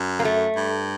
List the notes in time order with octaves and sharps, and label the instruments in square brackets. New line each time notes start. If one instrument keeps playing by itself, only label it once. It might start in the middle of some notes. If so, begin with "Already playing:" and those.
Already playing: [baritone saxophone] F#2
[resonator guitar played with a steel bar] A#3
A3
[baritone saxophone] G2